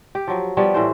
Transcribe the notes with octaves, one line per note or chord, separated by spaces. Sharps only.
G4
F3 F#3
F3 G3 B3 C#5
A2 E3 C5